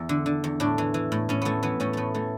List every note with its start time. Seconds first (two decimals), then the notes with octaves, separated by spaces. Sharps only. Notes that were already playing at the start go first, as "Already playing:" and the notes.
Already playing: E2
0.09 D3
0.26 D3
0.44 E2
0.60 A2 D4
0.78 E3
0.94 E3
1.12 A2
1.29 A2 C#4
1.42 E3 A3 B3
1.63 E3 B3
1.80 A2 C#4
1.93 A2 A3 B3
2.14 E3 A3